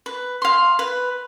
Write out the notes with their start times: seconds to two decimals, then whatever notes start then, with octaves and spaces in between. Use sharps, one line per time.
0.06 B4
0.42 F5 C6
0.79 B4